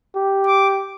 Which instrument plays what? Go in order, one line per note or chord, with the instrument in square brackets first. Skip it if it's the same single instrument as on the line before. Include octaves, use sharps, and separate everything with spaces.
[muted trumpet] G4
[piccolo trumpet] D6